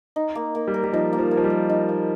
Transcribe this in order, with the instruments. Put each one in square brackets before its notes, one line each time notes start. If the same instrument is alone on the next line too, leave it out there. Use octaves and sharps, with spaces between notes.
[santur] D#4
A#3
A#3
[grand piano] G3
[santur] A#4
[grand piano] G3
[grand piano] F3 [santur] D#4
[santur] A#3
[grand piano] F3
[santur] A#3
[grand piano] F3
G3
[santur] A#4
D#4
A#3